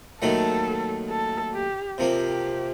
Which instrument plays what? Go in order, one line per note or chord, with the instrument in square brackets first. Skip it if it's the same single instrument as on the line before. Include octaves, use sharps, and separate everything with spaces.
[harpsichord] D#2 D#3 F#3 A3 [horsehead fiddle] A4
[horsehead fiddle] A4
G4
[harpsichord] C3 F3 A#3 [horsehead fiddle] G4